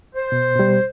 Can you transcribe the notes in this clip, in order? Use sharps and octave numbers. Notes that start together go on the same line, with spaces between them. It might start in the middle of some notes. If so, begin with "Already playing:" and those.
C5
B2
B2 G3